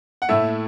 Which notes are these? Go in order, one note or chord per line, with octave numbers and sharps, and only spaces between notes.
F#5
A2 A3 E4 E5